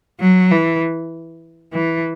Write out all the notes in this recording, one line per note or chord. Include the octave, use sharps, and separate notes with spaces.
F#3
E3
E3